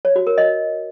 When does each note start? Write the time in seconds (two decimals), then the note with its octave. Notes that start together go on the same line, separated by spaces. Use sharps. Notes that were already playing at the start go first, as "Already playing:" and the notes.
0.05 C#5
0.16 F#4
0.27 A#4
0.38 D#5